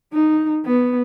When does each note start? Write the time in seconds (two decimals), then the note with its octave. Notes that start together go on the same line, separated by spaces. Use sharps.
0.13 D#4
0.65 B3